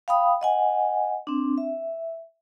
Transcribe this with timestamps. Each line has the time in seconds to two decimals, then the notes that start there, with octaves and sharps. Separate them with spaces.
0.08 F5 G5 B5 D#6
0.41 D#5 F#5 G#5
1.27 C4 D4
1.58 E5